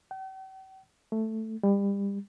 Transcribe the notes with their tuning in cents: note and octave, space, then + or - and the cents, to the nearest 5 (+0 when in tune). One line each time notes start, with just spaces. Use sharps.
G5 -45
A3 +5
G3 +30